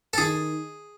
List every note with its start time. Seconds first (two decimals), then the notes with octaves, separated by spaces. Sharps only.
0.13 A4
0.18 D#3 G#4